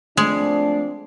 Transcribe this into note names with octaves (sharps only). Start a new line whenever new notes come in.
F3 G#3 A3 C4 D4 C7